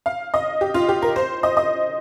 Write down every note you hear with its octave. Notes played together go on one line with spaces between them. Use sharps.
F5
D#5
G4
F4
G4
A#4
C5
D#5
D#5